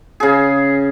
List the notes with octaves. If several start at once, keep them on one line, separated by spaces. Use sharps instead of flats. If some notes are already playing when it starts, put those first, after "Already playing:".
C#3 G#4